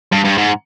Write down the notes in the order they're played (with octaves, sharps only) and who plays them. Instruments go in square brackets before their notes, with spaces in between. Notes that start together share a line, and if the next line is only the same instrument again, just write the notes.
[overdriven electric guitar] G2
G2
G#2